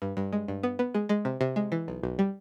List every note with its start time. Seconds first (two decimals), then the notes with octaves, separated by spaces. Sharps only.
0.02 G2
0.17 G2
0.33 G#3
0.48 G2
0.63 B3
0.79 B3
0.94 G#3
1.09 G#3
1.25 C3
1.41 C3
1.56 G#3
1.72 E3
1.88 B1
2.04 B1
2.19 G3